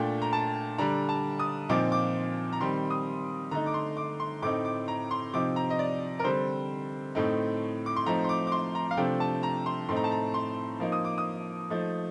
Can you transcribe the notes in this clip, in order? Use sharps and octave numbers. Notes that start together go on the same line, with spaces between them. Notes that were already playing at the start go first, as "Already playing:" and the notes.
Already playing: A#2 A3 D4 G5
A#5
A5
D3 G3 D4 A#5
A5
D#6
A#2 F3 C4 D#4 D6
D6
A#5
D#3 G3 C4 C6
D#6
D3 A3 D#4 A#5
D6
C6
D6
C6
A2 A3 C4 D#4 D6
D6
A#5
C6
C3 F3 C4 D#4 D6
A#5
D#5
D5
A#4
D3 G3 C4 C5
A2 A3 C4 D#4
D6
C6
F3 A3 C4 D#4 A#5
C6
D6
D6
C6
A#5
F5
C3 F3 A3 D4 G5
A5
A#5
C6
A2 A3 C4 D#4 C6
A#5
A5
A#5
C6
F3 A#3 D#4
D#6
D6
D#6
F3 A3 D#4